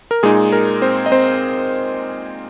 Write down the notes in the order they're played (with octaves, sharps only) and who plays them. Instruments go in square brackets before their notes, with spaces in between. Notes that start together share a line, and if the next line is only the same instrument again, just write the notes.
[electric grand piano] A#4
A#2 G#3 D#4 G#4
A#4
C4 C5
D#5
C4 C5